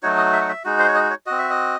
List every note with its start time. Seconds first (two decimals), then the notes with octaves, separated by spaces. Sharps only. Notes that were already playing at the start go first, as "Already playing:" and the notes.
0.03 F#3 A3 D#4 F#4 C#5
0.17 D#5
0.33 E5
0.41 F#5
0.49 E5
0.64 G#3 D#4 F#4
0.79 C5
0.88 C#5
0.95 D#5
1.10 C#5
1.26 C4 F#4 D#5
1.38 E5
1.50 D#5